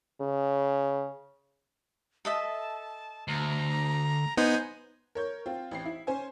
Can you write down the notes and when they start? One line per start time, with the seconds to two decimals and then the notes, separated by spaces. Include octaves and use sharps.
0.21 C#3
2.25 A4 D#5 E5 A5
3.28 D2 A#5
4.37 B3 D#4 C5 G#5
5.15 A#4 C#5 G6
5.46 C4 F4
5.71 A1 C4 G5 C7
5.85 E4
6.07 C#4 C5 G#5